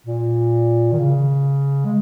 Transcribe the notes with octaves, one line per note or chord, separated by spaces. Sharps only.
A#2
D#3
C#3
G#3